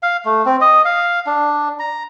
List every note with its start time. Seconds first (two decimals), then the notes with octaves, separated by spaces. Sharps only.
0.03 F5
0.25 A3
0.46 C4
0.61 D#5
0.85 F5
1.26 D4
1.79 A#5